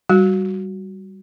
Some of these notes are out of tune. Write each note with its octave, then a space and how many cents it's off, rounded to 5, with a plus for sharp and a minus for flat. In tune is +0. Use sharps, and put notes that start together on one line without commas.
G3 -10 F#4 +0